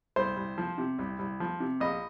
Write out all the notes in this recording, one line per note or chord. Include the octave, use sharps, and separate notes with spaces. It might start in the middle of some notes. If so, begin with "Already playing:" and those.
C2 C5
C2
F3
C3
C2
C2
F3
C3
A#1 D#5